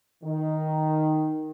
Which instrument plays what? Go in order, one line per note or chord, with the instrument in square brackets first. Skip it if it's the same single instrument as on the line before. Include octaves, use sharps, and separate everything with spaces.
[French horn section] D#3